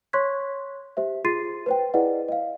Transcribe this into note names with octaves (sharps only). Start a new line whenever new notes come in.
C#5 C6 C#6 F#6 G#6 B6
G4 C5 E5
F4 G#4 C6 A6 C7 D#7
B4 C5 G5
E4 G#4 B4 D5 D#5 F#5
D#5 F5